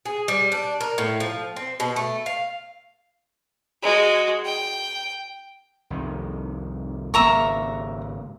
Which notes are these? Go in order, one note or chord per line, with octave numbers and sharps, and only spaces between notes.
G#4
G3
D4
A#4
A2
F3
C4
B2
A3
F5
G#3 F#4
G5
C2 F2 D#3
G#1 C#3 A#3 E5 A#5 C#6